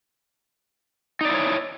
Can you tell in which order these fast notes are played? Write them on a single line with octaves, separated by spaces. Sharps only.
D#4 D5 E4 C#5